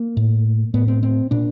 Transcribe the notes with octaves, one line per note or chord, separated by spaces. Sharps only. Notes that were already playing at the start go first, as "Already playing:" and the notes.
Already playing: A#3
A2
A2 B3
C4
C4
A#2 D4